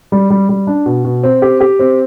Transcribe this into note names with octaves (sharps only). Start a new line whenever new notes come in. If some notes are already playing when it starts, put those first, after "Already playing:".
G3
G3
G3
D4
B2
B2
C4
G4
G4
C4